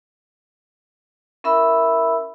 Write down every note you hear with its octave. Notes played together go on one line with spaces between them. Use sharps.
C#4 E4 A#4 E5 B5 E6